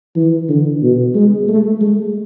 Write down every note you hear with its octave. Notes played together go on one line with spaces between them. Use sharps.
E3
D3
B2
G#3
A3
G#3